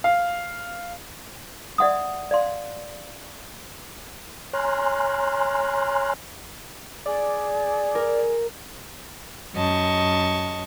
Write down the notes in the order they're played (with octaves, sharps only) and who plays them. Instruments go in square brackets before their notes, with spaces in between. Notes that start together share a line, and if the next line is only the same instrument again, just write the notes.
[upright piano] F5
[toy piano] D5 E5 F#5 C6 D#6
D5 F5 C6
[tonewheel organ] C#5 G#5 A#5 C6 F6 F#6
[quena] G#4 [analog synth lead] D5
[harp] A#4
[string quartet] F#2 D#5 A5 C#6